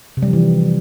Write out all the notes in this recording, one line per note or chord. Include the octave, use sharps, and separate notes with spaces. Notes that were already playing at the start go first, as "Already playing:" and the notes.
C3
G3
F3
E3